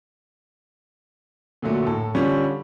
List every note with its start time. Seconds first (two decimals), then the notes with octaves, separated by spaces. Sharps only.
1.62 A#2 D3 F#3 A3
1.87 A2 A4
2.15 D3 G3 C#4 F4